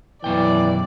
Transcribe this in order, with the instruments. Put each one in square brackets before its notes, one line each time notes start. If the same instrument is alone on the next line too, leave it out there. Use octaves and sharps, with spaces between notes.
[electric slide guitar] F#2 B2 G5 [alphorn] E3 [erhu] D5